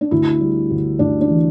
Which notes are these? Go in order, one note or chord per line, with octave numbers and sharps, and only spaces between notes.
D4
D2 E4
G3
D2
D2 D4
D4
E3